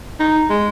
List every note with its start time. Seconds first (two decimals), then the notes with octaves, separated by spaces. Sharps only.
0.20 D#4
0.50 G#3